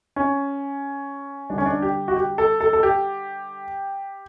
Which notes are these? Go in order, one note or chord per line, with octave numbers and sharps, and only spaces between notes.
C#4
D3 G3 D4
C#4
D4
G4
F#4
G4
A4
A4
A4
G4